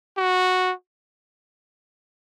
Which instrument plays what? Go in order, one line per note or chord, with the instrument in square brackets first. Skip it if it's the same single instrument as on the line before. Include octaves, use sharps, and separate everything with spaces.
[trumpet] F#4